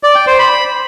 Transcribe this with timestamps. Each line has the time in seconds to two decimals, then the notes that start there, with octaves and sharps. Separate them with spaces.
0.03 D5
0.15 G5
0.27 C5
0.39 B5